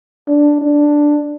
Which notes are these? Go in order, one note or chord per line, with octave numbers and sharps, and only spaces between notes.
D4
D4